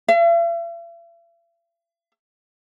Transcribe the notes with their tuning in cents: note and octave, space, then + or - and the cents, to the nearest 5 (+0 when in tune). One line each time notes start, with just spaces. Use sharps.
E5 +45